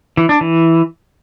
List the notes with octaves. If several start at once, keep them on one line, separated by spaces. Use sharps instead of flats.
E3
D4
E3